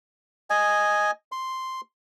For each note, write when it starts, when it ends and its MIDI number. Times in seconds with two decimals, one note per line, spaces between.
0.50 1.11 75
0.50 1.11 80
1.32 1.81 84